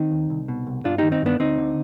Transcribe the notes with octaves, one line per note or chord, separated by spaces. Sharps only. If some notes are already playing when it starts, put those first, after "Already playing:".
Already playing: D#3 C4 D#4
D#2
C2
B2
C2
G2 D4 F4
D#3 D#4 G4
C4 D#4
G2 B3 D4
D2 C4 D#4
D3